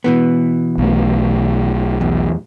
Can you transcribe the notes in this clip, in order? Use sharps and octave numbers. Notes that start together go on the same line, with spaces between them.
B2 E3 B3
B1 A3
E2